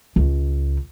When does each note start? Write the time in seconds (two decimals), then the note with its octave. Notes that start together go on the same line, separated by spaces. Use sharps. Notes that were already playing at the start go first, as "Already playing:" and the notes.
0.16 C#2